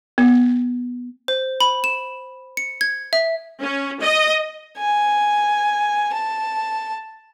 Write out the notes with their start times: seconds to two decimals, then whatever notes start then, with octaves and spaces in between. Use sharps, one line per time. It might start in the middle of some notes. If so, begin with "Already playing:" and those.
0.18 B3
1.28 C5
1.61 B5
1.84 E7
2.57 C#7
2.81 G#6
3.13 E5
3.61 C#4
4.01 D#5
4.78 G#5
6.13 A5